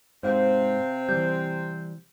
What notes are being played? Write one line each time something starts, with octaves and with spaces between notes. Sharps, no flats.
G#2 C3 C4 C5 F5
E3 G3 G6